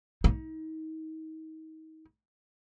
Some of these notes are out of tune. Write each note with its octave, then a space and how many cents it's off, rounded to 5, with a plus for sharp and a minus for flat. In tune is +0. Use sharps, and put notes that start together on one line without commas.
D#4 +30